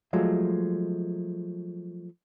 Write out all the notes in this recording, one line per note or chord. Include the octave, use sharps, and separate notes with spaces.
F3 F#3 G#3 A3